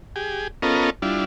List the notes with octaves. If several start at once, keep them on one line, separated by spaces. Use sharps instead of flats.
G4 G#4
B3 C#4 F4 A4 A#4 D#5
G3 D4 E4 F4